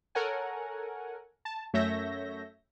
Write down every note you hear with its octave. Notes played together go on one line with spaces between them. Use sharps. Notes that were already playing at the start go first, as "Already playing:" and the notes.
A4 A#4 C#5 F#5 G#5
A5
F#2 A3 C#5 E5 G6 A#6